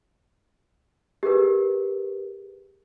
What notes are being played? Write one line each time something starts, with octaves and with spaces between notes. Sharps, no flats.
G4 G#4 A#4 B4